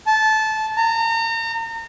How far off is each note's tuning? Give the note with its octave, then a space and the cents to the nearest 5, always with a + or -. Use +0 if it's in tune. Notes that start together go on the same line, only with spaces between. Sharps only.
A5 -15
A#5 -35